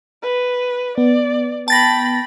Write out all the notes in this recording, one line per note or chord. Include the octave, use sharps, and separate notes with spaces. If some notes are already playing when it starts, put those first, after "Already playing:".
B4
B3 D5
G5 A5 B5 A6 A#6